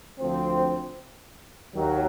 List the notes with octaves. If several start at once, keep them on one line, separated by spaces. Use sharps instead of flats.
D2 D3 F3 A3 C4
D#2 D#3 F#3